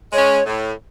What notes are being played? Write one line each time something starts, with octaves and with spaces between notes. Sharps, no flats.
G#3 C#4 C#5
A2